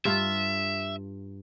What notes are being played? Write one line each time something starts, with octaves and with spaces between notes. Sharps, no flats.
G2 F4 E5